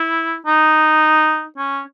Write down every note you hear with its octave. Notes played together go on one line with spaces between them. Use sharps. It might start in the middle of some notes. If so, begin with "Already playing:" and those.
Already playing: E4
D#4
C#4